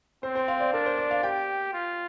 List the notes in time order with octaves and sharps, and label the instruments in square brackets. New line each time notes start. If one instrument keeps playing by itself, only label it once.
[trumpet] C4 [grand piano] C5
[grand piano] C5
F5
D5
[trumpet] D4 [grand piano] A#4
[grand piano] C5
D5
F5
[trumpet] G4 [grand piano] G5
[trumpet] F4